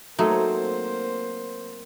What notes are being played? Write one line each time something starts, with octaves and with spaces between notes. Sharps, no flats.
F#3 A3 A#3 C4 D#4 C5